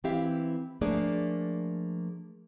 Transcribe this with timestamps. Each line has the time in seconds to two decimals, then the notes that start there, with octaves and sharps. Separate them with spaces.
0.04 E3 C4 E4 G4 E5 F5
0.81 F3 A3 A#3 D4 G#4 D5